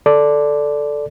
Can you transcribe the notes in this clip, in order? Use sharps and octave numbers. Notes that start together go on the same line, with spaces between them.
A4 D5